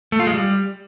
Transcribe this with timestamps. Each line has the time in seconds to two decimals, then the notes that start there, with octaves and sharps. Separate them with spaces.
0.12 A3
0.20 F4
0.27 G#3
0.34 G3